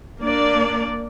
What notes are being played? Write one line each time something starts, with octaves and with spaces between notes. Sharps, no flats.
A#3 D4 D5